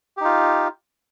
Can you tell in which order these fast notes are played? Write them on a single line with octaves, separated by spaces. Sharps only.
G4 D#4 F4